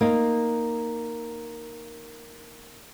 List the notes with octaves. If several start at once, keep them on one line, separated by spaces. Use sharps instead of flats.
A#3 D#4